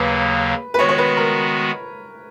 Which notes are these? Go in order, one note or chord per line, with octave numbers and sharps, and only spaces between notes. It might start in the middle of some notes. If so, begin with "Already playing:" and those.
Already playing: D#2 C#3 F#3 A#3 B4
B4
D#3 G#3 B3 F#4 C#5
C#5
B4
A#4